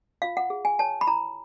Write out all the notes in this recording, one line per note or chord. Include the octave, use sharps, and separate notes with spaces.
F4 F5
F#5
G#4
G#5
C#5 A5
B5
E4 A#5